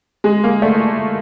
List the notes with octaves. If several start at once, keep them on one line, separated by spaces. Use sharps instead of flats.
G#3
A#3
A3